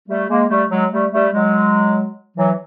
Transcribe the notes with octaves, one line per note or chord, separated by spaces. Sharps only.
G3 A3
G#3 A#3
G3 A3
F#3 G#3
G3 A3
G3 A3
F#3 G#3
E3 F#3